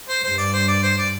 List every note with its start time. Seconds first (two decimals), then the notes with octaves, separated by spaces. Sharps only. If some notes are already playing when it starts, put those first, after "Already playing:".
0.09 C5
0.23 G2 C5
0.38 D5
0.53 C5
0.68 D5
0.83 C5
0.98 D5